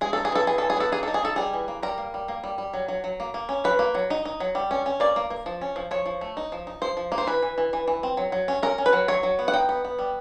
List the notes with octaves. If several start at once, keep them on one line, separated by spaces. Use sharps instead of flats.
G#3 G#4
D#4 A4
G#4
E3 A4
E3 G#4
E3 A4
G#4
B3 A4
A#3 G#4
D#4 A4
G#4
D#4 A4
G3 G#4
E3
A#3
G3 A#4
A#3
G3
A#3
G3
G3
F#3
F#3
F#3
A#3
A#3
C#4
F#3 B4
A#3
F#3
D#4
D#4
F#3
G3
C#4
C#4
A#3 D5
A#3
A#3
F3
C#4
F3
F3 C#5
F3
A3
D#4
F3
D#4
F3 C5
F3
A#3
C5
E3 B4
E3
E3
E3
E3
C4
F#3
F#3
C#4
C#4 A#4
C#4
B4
F#3
F#3 C#5
F#3
B3
F#5
D#4 G5
B3
B3
G3